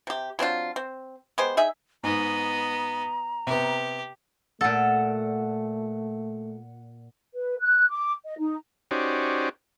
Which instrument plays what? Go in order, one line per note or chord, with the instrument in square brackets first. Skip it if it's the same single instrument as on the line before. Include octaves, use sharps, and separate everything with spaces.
[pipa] C3 G4
F#3 C4 D4 F4
C4
G#3 B3 G4 C5
D#4 G#4 E5
[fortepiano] G#2 [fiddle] B3 D#5 [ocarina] A#5
[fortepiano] C3 B3 [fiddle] G4
[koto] A#2 A4 [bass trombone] A3 [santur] F#5
[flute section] B4
F#6
D6
D#5
D#4
[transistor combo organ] C#4 D#4 F#4 G4 C5 D5